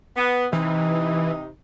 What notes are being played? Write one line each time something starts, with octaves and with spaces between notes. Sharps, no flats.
B3
C3 E3 D#4